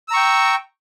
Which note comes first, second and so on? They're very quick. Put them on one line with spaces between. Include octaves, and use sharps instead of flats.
E6 A#5 C#6 G5